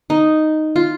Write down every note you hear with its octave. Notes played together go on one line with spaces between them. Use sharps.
D#4
F4